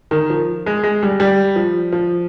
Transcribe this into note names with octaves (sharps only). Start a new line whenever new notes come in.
D#3
F3
G#3
G#3
G3
G3
F3
F3